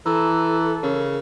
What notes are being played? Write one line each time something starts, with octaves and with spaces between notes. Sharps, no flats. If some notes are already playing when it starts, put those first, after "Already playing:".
E3 A4 A#5 E6
C#3 A#4